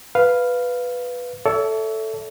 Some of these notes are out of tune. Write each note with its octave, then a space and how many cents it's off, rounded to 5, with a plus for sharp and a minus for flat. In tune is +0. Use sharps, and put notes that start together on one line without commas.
B4 +0 F5 +0
A4 +0 C#5 +40 E5 +0